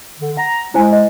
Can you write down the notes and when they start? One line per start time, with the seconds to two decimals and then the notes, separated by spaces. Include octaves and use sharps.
0.20 D3
0.37 F#5 A#5
0.74 G#3 E4 C5 G#5
0.93 D#5